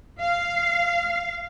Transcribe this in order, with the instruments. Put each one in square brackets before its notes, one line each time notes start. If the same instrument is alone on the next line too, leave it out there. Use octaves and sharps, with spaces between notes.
[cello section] F5